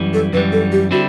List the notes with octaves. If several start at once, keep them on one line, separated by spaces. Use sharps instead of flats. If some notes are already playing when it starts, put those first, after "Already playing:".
Already playing: F#2 E3 G3
A4
F#2 E3 G3 B4
A4
G4
D3 G3 C4 E4 F#4